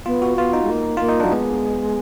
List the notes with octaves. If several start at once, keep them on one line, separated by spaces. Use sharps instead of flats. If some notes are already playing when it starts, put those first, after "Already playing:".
B3 F4
F#4
B3 F4
D#4
G#3
A#3
A#3 F4
D#4
F#3 D4
G#3 B3